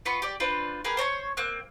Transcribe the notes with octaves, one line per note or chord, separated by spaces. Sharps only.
B3 F4 B5 C#6
G4 D5
D4 F4 B4 C5
G4 G#4 A#4 B4
C5 C#5 A#5 C#6
A#3 C4 F#6